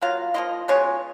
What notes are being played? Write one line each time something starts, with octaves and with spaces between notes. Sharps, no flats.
F#3 A#3 F4 F5
F3 A#3 F4 D#5
B2 G#3 C#4 F4 C#5